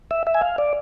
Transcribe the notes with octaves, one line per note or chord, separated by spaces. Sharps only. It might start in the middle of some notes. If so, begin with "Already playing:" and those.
E5
E5
G#5
F5
D5